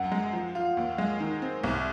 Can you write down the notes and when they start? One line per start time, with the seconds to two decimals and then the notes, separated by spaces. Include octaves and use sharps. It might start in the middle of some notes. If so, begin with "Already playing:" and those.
Already playing: F#2 F#5
0.12 G#3
0.33 F3
0.55 F4
0.77 D#2
0.98 G#3
1.20 D#3
1.42 C4
1.64 C2